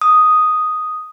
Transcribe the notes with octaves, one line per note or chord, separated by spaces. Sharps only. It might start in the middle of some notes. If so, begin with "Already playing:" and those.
D#6